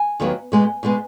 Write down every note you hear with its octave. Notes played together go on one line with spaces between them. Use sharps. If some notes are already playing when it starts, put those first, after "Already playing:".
Already playing: G#5
D#2 D#3 F#3 B3
B2 G#3 B3
B2 G#3 B3